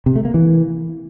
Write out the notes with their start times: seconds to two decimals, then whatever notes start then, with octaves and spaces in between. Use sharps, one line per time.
0.06 C3
0.16 A3
0.25 A#3
0.34 E3